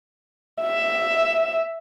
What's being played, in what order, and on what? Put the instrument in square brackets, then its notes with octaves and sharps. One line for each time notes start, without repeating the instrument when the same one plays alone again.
[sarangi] E5